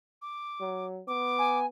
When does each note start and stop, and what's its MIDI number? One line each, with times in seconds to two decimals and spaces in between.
0.22 0.86 86
0.61 1.02 54
1.08 1.67 59
1.08 1.58 86
1.38 1.66 80